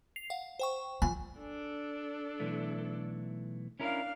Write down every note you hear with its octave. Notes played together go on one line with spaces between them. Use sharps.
C7 F7
F5 F#5
C5 G5 C#6
F3 G#5
D4 A4
B1 E3 A3
C#4 D4 E4 A#4 F5